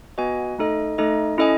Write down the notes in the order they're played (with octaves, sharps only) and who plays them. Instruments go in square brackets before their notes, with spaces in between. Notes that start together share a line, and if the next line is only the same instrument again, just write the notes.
[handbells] B3 F#4 B4 D#5 G#5
A3 D#4 A4 D#5
A3 D#4 A4 D#5
C#4 E4 A4 D#5 G#5